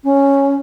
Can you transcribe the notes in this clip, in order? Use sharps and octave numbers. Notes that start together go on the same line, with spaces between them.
C#4